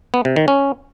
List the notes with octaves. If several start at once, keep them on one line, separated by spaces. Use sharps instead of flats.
B3
C3
D#3
C#4